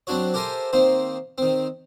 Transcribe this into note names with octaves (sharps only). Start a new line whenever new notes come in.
F#3 C4 D4 F#4 C#5
G4 A4 A#4 C5 E5 G#5
D#3 A#3 C4 C5
D#3 C4